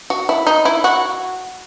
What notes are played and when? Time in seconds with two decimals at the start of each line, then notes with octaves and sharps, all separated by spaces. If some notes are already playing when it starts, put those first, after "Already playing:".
0.10 F#4
0.29 E4
0.47 D#4
0.65 E4
0.84 F#4